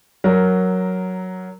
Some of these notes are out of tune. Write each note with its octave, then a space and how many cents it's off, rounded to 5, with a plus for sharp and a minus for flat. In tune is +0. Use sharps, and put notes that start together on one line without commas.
F#3 +0 A#4 +0